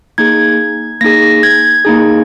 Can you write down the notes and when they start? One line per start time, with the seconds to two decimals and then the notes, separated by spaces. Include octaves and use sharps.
0.18 A#3 D#4 G#4 G#6
1.01 A#3 D#4 G#4 A#6
1.43 G#6
1.85 A#3 D#4 G#4